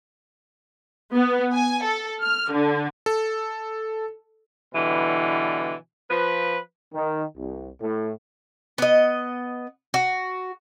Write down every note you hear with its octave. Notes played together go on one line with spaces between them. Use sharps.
B3
G#5
A4
F6
D3
A4
B2 D3 E3 G3
F3 B4
D#3
C2
A2
B3 D#5
F#4